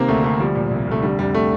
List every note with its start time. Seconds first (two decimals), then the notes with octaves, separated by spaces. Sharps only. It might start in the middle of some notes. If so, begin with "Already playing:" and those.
Already playing: C3 D#3 A#3 C4
0.08 D2 A3
0.24 D2 A3
0.40 F3 G3
0.55 A#2
0.71 C2
0.87 C2 A3
1.02 D3 G3
1.18 F2 G3
1.35 A3